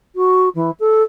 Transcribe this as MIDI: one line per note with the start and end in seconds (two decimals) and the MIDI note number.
0.15 0.49 66
0.55 0.71 52
0.80 1.02 69